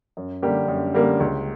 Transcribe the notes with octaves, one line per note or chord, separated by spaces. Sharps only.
F#2
D3 G3 A#3 G4
F#2
D3 G3 A#3
C#2